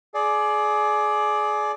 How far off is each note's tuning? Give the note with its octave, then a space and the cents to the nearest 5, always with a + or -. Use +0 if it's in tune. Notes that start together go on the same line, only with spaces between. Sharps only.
G#4 +25 D5 +0